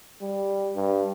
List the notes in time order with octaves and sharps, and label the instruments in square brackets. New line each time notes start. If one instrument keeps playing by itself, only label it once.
[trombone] G3
G2